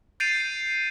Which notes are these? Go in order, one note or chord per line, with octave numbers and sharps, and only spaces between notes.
G6 A6 C7 D7 D#7 F7